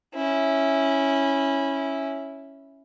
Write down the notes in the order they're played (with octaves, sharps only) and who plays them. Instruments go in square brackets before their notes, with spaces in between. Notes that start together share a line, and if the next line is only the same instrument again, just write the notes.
[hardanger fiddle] C#4 E4